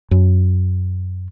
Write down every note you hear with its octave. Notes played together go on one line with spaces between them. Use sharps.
F#2